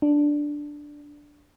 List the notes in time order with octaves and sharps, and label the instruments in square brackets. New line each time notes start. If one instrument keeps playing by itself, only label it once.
[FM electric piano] D4